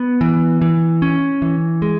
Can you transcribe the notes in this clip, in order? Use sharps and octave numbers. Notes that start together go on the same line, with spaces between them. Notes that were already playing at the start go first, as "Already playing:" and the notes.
Already playing: B3
E3
E3
C#4
E3
G#3